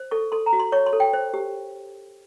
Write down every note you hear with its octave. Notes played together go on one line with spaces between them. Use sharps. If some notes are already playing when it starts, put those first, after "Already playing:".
Already playing: C5
A4 C#6
A4 C6
A#5
F#4
C6
C#5 C#6
C6
A4
G5
C5
G4